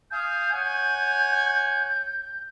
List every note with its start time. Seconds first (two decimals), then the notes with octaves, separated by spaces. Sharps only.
0.11 F5 G#5 D#6 G6
0.51 C#5 F#5 G#5